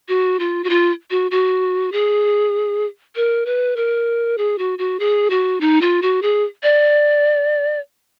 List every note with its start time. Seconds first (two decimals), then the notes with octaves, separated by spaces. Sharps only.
0.09 F#4
0.39 F4
0.64 F#4
0.70 F4
1.11 F#4
1.31 F#4
1.92 G#4
3.16 A#4
3.46 B4
3.76 A#4
4.38 G#4
4.58 F#4
4.79 F#4
5.00 G#4
5.30 F#4
5.61 D#4
5.81 F4
6.02 F#4
6.22 G#4
6.63 D5